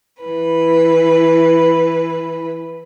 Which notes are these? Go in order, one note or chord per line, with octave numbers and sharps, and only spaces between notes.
E3 B4